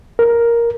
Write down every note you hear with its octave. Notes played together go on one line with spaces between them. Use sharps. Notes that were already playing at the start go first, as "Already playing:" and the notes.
A#4